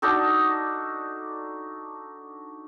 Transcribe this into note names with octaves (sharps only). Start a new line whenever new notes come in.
D4 D#4 F#4 A4